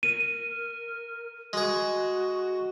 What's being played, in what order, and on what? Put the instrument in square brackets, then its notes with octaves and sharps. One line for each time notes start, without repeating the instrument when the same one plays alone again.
[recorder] A#4 [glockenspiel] D#7
[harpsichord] G#3 G#4 [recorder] F#4